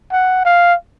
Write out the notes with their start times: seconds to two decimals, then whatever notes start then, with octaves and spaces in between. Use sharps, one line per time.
0.12 F#5
0.45 F5